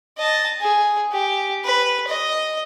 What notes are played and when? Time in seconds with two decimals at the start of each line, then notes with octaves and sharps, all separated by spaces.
0.18 D#5 A5
0.61 G#4
1.12 G4
1.64 B4
2.08 D#5